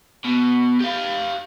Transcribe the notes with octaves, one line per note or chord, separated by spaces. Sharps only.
B2
G4 F5